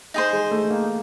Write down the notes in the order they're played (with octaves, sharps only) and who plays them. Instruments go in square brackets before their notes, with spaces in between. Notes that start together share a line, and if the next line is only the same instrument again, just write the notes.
[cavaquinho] D#4 G#4 C5
[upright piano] G#3
A3
A#3